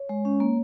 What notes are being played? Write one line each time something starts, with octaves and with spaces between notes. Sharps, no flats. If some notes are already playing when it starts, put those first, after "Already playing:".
Already playing: C#5
G#3
C#4
A#3